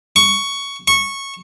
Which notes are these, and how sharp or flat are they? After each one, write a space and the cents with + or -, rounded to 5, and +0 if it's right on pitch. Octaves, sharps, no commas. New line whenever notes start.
C#6 +10
C#6 -10